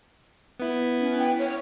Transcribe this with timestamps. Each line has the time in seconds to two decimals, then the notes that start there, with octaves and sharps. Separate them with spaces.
0.60 B3 E4
1.00 C#4
1.18 G5
1.38 C#5